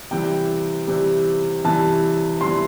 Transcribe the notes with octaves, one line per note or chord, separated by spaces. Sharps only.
C3 E3 G3 G5
C3 E3 G3
C3 E3 G3 A5
C3 E3 G3 C6